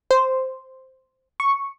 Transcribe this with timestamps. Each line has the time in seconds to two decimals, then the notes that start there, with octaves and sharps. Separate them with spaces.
0.11 C5
1.40 C#6